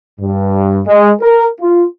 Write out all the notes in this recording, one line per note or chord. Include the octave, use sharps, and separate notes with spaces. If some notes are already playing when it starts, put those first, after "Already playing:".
G2
G#3
A#4
F4